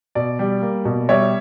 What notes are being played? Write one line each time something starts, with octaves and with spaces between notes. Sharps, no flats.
B2 D5
G3
A#3
B2
G3 C#5 E5